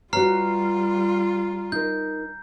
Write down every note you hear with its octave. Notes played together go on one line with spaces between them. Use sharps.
G3 F4 F#4 B4 C#5 A#5 F6 C7
D#4 A#4 G6